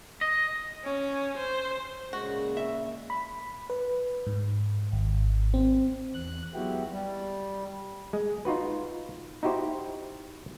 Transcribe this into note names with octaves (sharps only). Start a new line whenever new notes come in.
D#5
C#4
C5
A#2 C#3 G#3 F#4
E5
B5
B4
G#2
G#1
C4
E2 F#6
F#3 G#3 B3 E4 F#4 G4
G3
G#3
D#4 F4 F#4 B4
D#4 E4 F#4 G4 C5